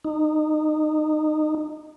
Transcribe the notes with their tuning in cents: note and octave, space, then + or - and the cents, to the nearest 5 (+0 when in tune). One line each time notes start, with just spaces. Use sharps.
D#4 -20